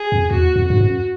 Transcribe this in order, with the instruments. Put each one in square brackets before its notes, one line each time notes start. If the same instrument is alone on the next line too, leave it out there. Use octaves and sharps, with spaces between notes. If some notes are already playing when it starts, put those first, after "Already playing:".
Already playing: [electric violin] G#4
[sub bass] F2
[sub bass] E2 [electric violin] F#4
[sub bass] F2
[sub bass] G2 [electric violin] F#4
[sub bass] F#2